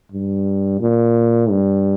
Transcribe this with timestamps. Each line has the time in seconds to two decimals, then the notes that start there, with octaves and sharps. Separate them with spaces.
0.12 G2
0.81 A#2
1.50 G2